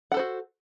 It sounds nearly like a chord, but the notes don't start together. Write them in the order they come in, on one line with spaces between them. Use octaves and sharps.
F#5 A4 C5 F#4